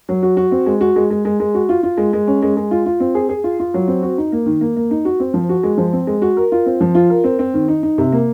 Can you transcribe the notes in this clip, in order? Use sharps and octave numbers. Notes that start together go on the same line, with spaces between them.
F#3
F#4
F#4
C4
G#3
F#4
G#3
G#3
G#3
G#3
F#4
F4
F4
G#3
G#3
C#4
G#3
G#3
F4
F4
C4
G#4
G#4
F4
F4
F#3
C4
F#4
D#4
A#3
D#3
A#3
A#3
D#4
F#4
C4
F3
F#4
G#3
F3
C4
G#3
F#4
A#4
F4
C4
F3
F4
A#4
C4
C4
D#3
D#4
D#4
C3
A#3